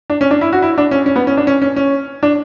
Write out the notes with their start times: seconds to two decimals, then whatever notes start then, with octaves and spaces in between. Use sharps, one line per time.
0.10 D4
0.21 C#4
0.31 D4
0.41 E4
0.53 F#4
0.62 E4
0.78 D4
0.91 C#4
1.06 C#4
1.16 B3
1.27 C#4
1.37 D4
1.47 C#4
1.62 C#4
1.76 C#4
2.23 D4